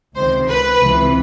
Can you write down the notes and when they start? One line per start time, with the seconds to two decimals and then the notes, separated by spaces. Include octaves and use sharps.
0.16 C#2 C3 D#3 C5
0.50 B4
0.83 C#2 C3 E3